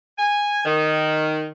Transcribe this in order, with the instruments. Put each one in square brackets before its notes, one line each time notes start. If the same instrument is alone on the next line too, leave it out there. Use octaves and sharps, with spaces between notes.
[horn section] G#5
D#3